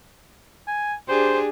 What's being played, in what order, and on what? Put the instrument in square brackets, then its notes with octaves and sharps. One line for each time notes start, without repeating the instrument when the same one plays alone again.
[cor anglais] G#5
[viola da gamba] D4 G4 G#4 [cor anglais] C5